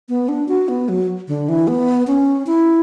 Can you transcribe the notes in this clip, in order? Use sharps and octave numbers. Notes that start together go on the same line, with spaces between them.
B3
D4
F#4
B3
F#3
D3
E3
B3
C#4
E4